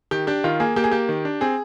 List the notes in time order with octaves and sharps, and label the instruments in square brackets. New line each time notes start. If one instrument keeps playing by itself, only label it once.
[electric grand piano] D#3 [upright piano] G4
[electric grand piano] D4 [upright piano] G4
[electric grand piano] D#3 [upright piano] F4
[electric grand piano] A#3 [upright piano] G#4
[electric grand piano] A#3 [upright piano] G4
[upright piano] G#4
[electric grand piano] A#3 [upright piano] G4
[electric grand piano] D#3
D4
[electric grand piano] C4 [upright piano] G#4